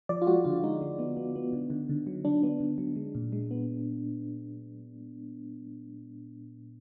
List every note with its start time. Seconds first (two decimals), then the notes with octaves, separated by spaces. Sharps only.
0.09 F3 D5
0.22 F4
0.27 G#3 F#4
0.45 D3 F4
0.63 G#3 D#4
0.81 G#3
0.99 B3
1.17 B3
1.35 B3
1.53 D3
1.70 D3
1.89 D3
2.07 F#3
2.25 F#3 D4
2.43 B3
2.60 D3
2.78 F#3
2.96 G#3
3.15 A#2
3.32 G#3
3.51 B3